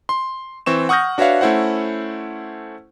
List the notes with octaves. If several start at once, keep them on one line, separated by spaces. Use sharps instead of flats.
C6
E3 C4 C#6 E7
F#5 C#6 D#6 F6 G6 A#6
D4 F#4 B4 C#5 E5 F5
A3 C#4 E4 C5 F#5